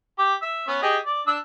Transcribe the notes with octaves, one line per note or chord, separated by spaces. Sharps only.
G4 D6
E5
B3 C#4
G4 G#4 D#5
D5
D4 D5 E6